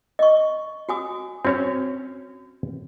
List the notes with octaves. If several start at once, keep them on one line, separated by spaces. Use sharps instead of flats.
D#5 C#6
F#4 G#5 D#6
C4 C#4 F#4 C#5